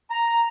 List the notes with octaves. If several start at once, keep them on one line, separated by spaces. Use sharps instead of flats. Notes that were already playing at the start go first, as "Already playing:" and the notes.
A#5